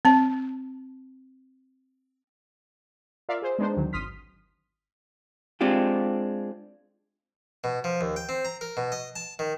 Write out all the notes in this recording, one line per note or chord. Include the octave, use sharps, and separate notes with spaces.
C4 A5
F4 A#4 D5 E5 F5
G#4 C5
G#3 B3 D4 D#4 C5
D2 D#3 F#3
G#1 C6 D#6 F6 B6
G#3 C4 D4 F4 G4
B2
F3
D#2
G5
C4
A#5
A#4
B2
D#5
A5
D#3